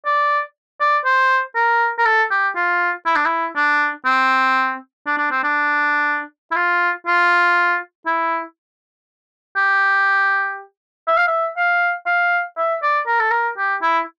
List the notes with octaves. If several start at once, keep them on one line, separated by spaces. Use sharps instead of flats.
D5
D5
C5
A#4
A#4
A4
G4
F4
E4
D4
E4
D4
C4
D4
D4
C4
D4
E4
F4
F4
E4
G4
E5
F5
E5
F5
F5
E5
D5
A#4
A4
A#4
G4
E4